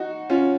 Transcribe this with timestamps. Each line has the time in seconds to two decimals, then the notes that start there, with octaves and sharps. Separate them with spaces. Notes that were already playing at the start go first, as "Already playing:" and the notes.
Already playing: D#4 F#4
0.30 C#4 F4